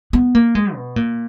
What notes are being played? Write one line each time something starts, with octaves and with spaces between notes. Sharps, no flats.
B3
A#3
G#3
B2
A#2